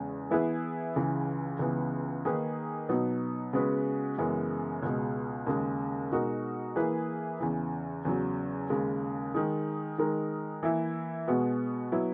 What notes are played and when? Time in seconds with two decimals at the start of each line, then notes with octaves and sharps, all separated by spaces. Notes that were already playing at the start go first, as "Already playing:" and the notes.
Already playing: E2 C#3 G#3
0.30 E3 B3 E4 G#4 B4
0.96 C#2 C#3 E3
1.59 C#2 C#3 E3 B3
2.25 D#3 A#3 D#4 G#4 B4
2.89 B2 F#3 B3 D#4
3.53 C#3 G#3 B3 F#4 B4
4.18 F#2 C#3 E3 G#3 B3
4.83 C#2 B2 G#3
5.47 D#2 C#3 G#3
6.11 B2 G#3 D#4 F#4 A#4
6.76 E3 A#3 E4 G#4 B4
7.40 E2 C#3 E3
8.05 E2 C#3 F#3
8.70 D#2 C#3 G#3
9.34 D#3 G#3 D#4
9.98 D#3 G#3 D#4 A#4
10.63 E3 A#3 E4
11.28 B2 G#3 B3 F#4
11.92 F#3 B3 E4